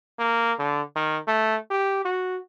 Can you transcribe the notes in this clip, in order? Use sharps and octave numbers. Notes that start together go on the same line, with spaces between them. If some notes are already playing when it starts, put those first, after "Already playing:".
A#3
D3
D#3
A3
G4
F#4